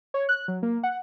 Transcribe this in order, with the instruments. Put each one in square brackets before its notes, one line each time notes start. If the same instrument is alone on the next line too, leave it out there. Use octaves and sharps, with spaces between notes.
[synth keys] C#5
F#6
F#3
A#3
F#5